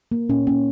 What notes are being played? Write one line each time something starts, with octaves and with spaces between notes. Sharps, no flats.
A#3
A#2 C#4
A#3 C#4